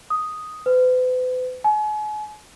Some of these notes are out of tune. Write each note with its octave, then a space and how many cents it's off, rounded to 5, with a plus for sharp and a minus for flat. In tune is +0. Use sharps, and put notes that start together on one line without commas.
D#6 +0
B4 +45
G#5 +40